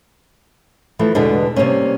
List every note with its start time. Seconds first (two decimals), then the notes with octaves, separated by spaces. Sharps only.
0.99 E3 F3 A3
1.15 E2 B2 D3 G#3 D4 B4
1.56 C3 G3 G#3 A#3 C#4